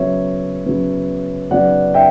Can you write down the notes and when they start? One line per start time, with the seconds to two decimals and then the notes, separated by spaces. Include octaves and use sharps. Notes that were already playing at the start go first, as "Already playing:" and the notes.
Already playing: C#3 F#3 B3 C#5 E5
0.65 C#3 F#3 B3
1.51 C#3 F#3 B3 D5 F#5
1.94 E5 G5